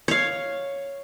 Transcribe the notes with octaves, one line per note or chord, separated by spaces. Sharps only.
C#5 F5